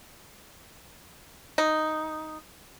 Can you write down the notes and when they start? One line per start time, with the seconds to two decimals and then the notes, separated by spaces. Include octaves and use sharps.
1.58 D#4